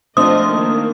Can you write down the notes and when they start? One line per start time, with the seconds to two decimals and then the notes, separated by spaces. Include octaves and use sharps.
0.17 F3 A3 C4 D4 F4 D#5 D#6
0.50 D#3 A#3